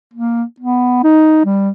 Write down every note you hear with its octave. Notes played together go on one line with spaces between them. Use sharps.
A#3
B3
D#4
G3